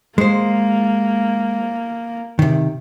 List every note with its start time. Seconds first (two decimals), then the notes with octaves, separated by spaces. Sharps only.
0.18 G#3 A#3 C5
2.39 C3 D#3